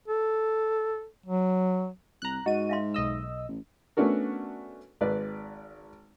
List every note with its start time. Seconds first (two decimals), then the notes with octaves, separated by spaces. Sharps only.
0.08 A4
1.26 F#3
2.22 C2 A#5 F#6
2.46 G#2 F#4 D#5 D#7
2.69 E5 F5 C6
2.94 B1 D#5 E6
3.48 A1
3.97 A3 B3 C#4 D4 F#4 A#4
5.01 G#1 B4 D5